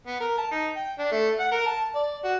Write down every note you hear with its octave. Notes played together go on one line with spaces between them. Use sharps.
B3
A#4
A5
D#4
G5
D4
A3
F#5
A#4
A5
D5
F#4